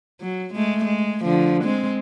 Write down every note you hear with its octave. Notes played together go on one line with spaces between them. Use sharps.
F#3
G#3 A3
G#3
D3 F3
G#3 C4